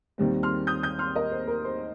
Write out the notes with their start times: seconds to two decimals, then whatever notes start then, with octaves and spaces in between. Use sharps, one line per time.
0.18 D#2 D#3 G3 C4
0.43 C6 F6
0.67 D#6 G6
0.83 D#6 G6
0.99 C6 F6
1.15 A#4 D#5
1.32 C5
1.47 A#4
1.65 C5